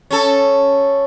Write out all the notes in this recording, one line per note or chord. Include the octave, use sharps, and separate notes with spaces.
C#4 A4